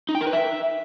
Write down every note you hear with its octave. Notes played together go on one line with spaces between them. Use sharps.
D#4
G5
A#4
B4
E5